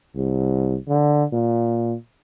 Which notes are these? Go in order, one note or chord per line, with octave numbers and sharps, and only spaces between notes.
C2
D3
A#2